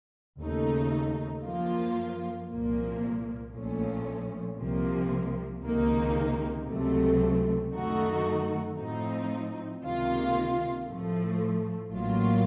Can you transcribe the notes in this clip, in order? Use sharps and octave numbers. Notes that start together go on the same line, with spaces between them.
D#2 C#3 A3 D#4
F#2 F3 A#3 F4
C2 A#2 F3 A#3
A#1 A#2 F3 A3 C#4
C2 C3 F3 A#3
C#2 C3 D#3 A#3 D#4
C#2 C3 F#3 A3
F#2 D#3 A3 D#4 F#4
A2 F3 C4 D#4
C#2 C3 D#3 A#3 F4
A2 F3 A3
A1 A2 F#3 A#3 F4